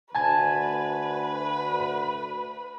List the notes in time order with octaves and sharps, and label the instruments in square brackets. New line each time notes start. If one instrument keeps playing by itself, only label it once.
[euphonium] D2 [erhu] B4 [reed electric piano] G#5 A5 G#6